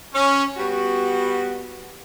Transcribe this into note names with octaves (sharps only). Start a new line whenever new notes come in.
C#4
G3 B3 F#4